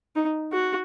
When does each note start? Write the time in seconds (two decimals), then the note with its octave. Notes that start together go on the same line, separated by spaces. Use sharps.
0.15 D#4
0.53 F#4